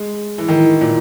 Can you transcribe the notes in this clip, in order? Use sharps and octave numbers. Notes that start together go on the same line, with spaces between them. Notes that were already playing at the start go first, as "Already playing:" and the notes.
Already playing: G#3
E3
D#3
A#2